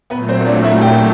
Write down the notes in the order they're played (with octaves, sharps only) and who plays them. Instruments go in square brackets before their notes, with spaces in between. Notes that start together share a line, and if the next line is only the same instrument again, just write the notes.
[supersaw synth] A#2 F#3 A3 [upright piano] B3 B4
[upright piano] C4 C5
D4 D5
E4 E5
G4 G5